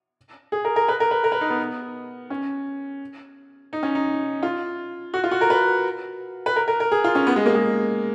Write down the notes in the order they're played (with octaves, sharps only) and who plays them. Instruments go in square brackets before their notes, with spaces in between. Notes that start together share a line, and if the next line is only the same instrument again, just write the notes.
[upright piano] G#4
A#4
A#4
B4
A#4
B4
A#4
B4
D#4
B3
C#4
D#4
C#4
D#4
F4
F#4
F4
F#4
A#4
B4
B4
A#4
A#4
A#4
G#4
F4
C#4
B3
G#3
A#3
G#3